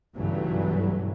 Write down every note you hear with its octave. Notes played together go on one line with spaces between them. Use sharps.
B1 G2 C#3 E3 F#3 A3